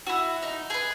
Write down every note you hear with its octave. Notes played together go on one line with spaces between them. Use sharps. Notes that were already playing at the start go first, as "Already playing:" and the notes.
E4 F#4
D#4
G#4 B4